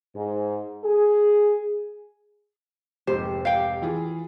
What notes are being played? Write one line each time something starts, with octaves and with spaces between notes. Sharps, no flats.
G#2
G#4
F1 G#2 G4 C5
F5 G5
E3 F4 G#4